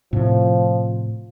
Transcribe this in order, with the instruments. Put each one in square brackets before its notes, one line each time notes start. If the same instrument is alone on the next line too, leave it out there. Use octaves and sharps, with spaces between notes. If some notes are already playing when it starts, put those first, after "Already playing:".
[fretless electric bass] A2 C3 [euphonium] F3